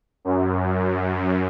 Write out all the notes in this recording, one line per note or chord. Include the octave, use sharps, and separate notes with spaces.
F#2